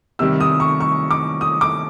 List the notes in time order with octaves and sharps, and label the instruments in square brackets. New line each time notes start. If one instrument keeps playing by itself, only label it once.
[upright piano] C3 D#3 G3 E6
D#6
C#6
C#6
D6
D#6
D6